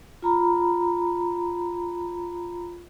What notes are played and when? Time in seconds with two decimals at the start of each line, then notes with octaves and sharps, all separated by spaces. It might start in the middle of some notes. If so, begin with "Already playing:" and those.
0.22 F4 A#5 B5